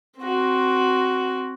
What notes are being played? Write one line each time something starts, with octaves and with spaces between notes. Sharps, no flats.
C4 F#4